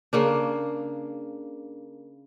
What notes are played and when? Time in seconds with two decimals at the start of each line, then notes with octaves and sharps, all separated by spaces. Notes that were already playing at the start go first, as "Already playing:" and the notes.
0.13 C#3 A#3 D4